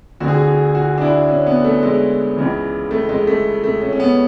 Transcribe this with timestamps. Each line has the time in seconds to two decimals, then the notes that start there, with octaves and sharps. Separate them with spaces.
0.20 D2 D3 F#4
0.28 G#4
0.35 F#4
0.47 G#4
0.75 F#4
0.98 D4
1.02 E4
1.29 C#4
1.47 B3
1.64 A3
1.83 G#3
2.37 C#2 C#3 E3
2.91 A3
3.09 G#3
3.27 A3
3.64 A3
3.81 C#4
3.92 C#4
4.00 B3